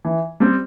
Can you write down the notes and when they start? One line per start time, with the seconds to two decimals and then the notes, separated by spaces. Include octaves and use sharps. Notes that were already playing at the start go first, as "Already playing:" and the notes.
0.05 E3
0.40 G3 C4